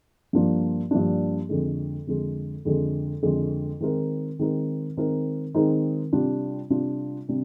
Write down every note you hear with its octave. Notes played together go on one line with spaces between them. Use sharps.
G2 F3 A#3 D4
G2 F3 A#3 D4
F2 D3 G#3
F2 D3 G#3
F2 D3 G#3
F2 D3 G#3
D#3 G#3 C4 D#4 A#4
D#3 G#3 C4 D#4 A#4
D#3 G#3 C4 D#4 A#4
D#3 G#3 C4 D#4 A#4
C3 G3 D4 F4
C3 G3 D4 F4
C3 G3 D4